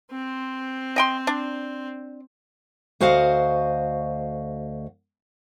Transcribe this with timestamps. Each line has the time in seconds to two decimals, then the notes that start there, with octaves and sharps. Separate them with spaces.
0.11 C4 C5
0.96 D#5 G5 C6
1.27 D4
3.00 D2 F#4 C5 D#5 F5 F#5